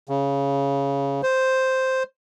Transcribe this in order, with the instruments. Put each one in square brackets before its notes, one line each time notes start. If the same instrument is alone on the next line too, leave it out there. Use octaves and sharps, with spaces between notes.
[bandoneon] C#3
C5